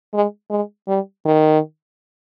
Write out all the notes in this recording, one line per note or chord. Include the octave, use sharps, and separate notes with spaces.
G#3
G#3
G3
D#3